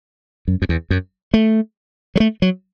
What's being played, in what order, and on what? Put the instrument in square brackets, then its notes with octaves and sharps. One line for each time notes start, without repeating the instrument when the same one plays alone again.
[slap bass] F#2
F#2
E2
F#2
A3
F#3
A3
F#3